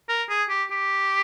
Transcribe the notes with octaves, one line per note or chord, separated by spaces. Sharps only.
A#4
G#4
G4
G4